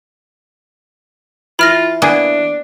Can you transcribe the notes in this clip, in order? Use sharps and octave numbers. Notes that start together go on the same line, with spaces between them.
E3 F4 B5 F6 A#6
A#3 B3 D4 G#4